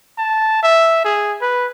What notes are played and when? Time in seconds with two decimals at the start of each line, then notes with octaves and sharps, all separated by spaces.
0.18 A5
0.63 E5
1.05 G#4
1.42 B4